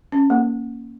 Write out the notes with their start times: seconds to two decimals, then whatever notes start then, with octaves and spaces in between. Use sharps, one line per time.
0.12 C#4
0.30 A#3